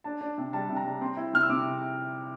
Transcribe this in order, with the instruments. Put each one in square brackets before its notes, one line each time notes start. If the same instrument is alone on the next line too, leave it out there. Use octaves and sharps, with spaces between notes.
[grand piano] D4 A5
D4
C3
G3 A5
C3
A#5
G3
C4 C6
E4
C3 F6
E6
C3 D6